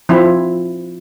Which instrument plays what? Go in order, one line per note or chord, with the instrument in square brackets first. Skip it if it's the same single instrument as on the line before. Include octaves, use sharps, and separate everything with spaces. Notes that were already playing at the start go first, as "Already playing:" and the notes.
[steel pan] F3 C4 E4